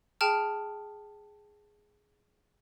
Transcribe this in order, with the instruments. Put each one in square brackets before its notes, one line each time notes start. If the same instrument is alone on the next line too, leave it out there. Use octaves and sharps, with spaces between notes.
[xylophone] G#4 G5 A5 F6